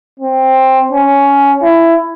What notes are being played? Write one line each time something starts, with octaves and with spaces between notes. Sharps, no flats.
C4
C#4
E4